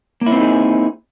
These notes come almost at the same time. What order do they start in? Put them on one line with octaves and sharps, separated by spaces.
A#3 E4 C4 D#4 G#4